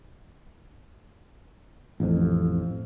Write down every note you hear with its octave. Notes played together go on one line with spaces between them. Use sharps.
A1 F2